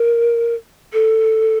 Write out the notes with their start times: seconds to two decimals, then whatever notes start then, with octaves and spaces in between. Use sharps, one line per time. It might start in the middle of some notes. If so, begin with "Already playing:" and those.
Already playing: A#4
0.93 A4